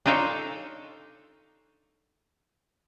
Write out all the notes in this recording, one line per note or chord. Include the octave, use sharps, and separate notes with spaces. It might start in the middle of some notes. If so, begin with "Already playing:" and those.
D4 D#4 F4 A4 C#5